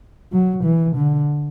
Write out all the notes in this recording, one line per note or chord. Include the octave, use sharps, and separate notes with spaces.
F#3
E3
D3